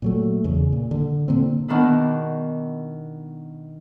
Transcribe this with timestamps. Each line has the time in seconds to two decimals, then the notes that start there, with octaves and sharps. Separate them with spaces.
0.02 A#2 F#3 A3
0.44 E2 C#3
0.72 A#2
0.91 D3
1.28 A#2 D3 A#3 C4
1.68 B2 D#3 B3 D4 E4